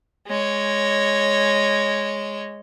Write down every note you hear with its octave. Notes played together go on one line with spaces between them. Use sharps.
G#3 C#5